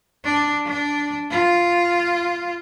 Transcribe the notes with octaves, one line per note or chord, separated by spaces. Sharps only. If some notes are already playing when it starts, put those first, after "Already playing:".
D4
D4
F4